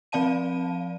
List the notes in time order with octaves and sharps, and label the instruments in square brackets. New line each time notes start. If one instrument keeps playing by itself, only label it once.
[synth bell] F3 C4 D5 F5 A5 D#7